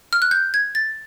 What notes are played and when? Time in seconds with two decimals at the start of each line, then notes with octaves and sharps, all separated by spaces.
0.13 F6
0.22 F#6
0.31 G6
0.54 G#6
0.75 A6